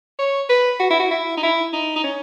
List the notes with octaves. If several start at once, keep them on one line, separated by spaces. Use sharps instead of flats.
C#5
B4
F#4
E4
F#4
E4
D#4
E4
D#4
D#4
C#4